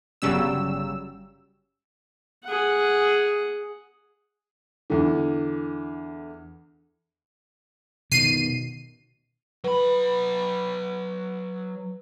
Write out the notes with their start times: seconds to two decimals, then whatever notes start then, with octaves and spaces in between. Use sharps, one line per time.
0.22 G1 C#3 F#3 G3 C#4 E6
2.44 G#4 F#5
4.90 E2 D3
8.12 B2 D#3 C7 D#7
9.64 F#3 B4 B5